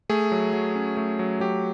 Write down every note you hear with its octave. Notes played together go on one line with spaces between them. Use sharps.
A3 G#4
F#3
F#3
C#4
A3
F#3
F#3 G4